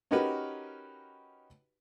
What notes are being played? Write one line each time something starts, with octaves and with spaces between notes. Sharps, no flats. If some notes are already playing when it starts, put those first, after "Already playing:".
C#4 D#4 F#4 G4 A#4 B4